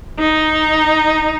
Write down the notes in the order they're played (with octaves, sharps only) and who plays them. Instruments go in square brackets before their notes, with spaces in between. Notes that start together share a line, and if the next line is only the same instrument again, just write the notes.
[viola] D#4